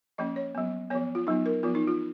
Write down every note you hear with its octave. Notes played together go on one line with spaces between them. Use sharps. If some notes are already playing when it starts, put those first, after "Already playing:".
F3 A#3 C#4 D#5
C#5
F#3 B3
F3 B3 C#5
F4
F#3 B3 D#4
A#4
F3 B3 F4
D#4
F4